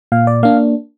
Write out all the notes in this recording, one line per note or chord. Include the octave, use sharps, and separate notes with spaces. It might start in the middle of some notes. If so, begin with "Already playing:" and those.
A#2 F5
D5
A#3 D4 F5